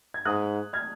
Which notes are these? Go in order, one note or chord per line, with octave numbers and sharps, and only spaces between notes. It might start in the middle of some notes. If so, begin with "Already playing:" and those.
G#6
G#2 D#6 F#6
F6 G#6